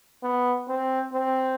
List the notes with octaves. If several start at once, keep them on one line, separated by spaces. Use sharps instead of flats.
B3
C4
C4